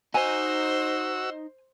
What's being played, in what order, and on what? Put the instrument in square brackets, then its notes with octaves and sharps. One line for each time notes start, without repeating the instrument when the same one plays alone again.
[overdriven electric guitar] D#4 [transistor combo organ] F#4 E6 [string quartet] C5 [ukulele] G#5